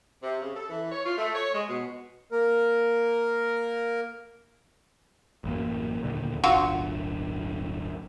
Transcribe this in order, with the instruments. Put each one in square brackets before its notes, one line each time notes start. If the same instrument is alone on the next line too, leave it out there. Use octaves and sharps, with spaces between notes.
[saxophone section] C3
C#3
A4
E3
C#5
F4
A3
C#5
G#3
B2
[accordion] A#3 A#4
[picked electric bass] A1 F#2 A#3
D#2 A#2 D3
[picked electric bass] D1 G1 D4 [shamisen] F#3 F4 F#4